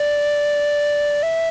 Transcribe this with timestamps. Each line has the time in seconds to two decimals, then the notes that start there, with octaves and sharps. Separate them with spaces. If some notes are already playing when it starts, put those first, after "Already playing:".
Already playing: D5
1.23 E5